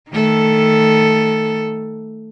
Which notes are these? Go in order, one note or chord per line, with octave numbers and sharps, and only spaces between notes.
D#3 A3 A4